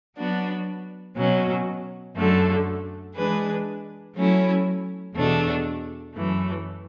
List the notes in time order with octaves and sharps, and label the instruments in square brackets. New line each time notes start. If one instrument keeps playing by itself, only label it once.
[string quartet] F#3 B3 D4 F#4
B2 F#3 C#4
F#2 D3 A3
E3 G#3 D4 G#4 B4
F#3 A3 C#4 E4
E2 B2 A3 D4
F#2 E3 A3